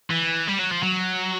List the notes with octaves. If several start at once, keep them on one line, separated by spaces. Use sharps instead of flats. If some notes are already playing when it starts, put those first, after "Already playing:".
E3
G3
F#3
F3
F#3